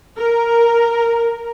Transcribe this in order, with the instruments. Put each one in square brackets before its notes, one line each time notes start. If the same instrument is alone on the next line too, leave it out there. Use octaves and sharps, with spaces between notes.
[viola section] A#4